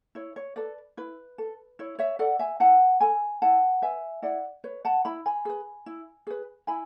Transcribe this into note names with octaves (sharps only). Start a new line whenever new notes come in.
E4 C#5
C#5
A4 B4 D5
E4 B4
A4
E4 C#5
C#5 E5
A4 D5 F#5
E5 G#5
E4 F#5 A5
A4 G#5 B5
E4 F#5 A5
B4 E5 G#5
E4 D5 F#5
B4 C#5
F#5 A5
E4 B5
G#5 B5
G#4 B4
E4
G#4 B4
E4 G#5 B5